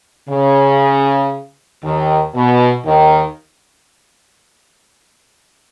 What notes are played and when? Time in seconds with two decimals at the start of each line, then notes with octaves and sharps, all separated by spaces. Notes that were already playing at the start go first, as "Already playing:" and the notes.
0.30 C#3
1.83 D#2 D#3
2.35 B2
2.86 D#2 D#3